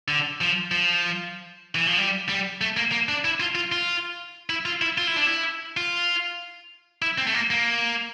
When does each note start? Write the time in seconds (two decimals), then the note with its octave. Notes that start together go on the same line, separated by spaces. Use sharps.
0.08 D3
0.41 F3
0.71 F3
1.75 E3
1.87 F3
1.98 G3
2.29 G3
2.61 A3
2.77 A#3
2.92 A#3
3.09 D4
3.25 E4
3.40 F4
3.55 F4
3.72 F4
4.50 E4
4.65 F4
4.82 E4
4.98 F4
5.07 E4
5.16 D4
5.27 E4
5.77 F4
7.02 E4
7.18 C4
7.27 A3
7.34 A#3
7.50 A#3